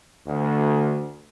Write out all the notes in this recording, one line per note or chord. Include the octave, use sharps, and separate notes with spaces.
D2